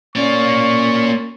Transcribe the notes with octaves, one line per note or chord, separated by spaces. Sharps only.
A#3 C#4 D5 C#6